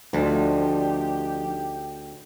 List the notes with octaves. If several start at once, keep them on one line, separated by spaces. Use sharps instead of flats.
D2 F3 D4 D#4 G4